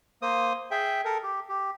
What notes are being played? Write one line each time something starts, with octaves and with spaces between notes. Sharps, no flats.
A#3 C5 D#6
G#4 E5 G5
A4 A#4
G4
G4